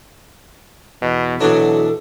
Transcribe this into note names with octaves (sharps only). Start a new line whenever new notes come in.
E2 B2
B2 E3 F#3 D4 A4